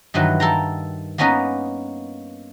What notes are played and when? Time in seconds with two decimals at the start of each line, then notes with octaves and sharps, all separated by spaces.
0.14 G2 D#3 E3 F#3 B4
0.40 A4 A#4 F5 G5 A#5
1.18 A#3 B3 C#4 D#4 A#4 B4